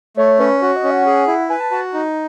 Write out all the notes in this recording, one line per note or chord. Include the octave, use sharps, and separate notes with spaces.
A3 C#5
C#4 B4
F#4 C#5
D#5
C#4
F#5
G#4
E4
B4 G#5
A5
F#4 A5
D#4